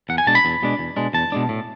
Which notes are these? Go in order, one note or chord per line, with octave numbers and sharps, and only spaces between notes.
E2 F#5
G#5
B2 G#3 D4 A5
B5
E2
B2 G#3 D4
E2
B2 G#3 D4
E2 A5
B2 G#3 D4
A2